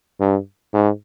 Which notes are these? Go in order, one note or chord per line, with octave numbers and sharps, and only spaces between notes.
G2
G#2